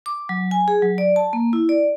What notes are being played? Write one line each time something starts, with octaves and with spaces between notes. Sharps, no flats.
D6
F#3
G#5
G#4
F#3
D5
A5
A#3
E4
D5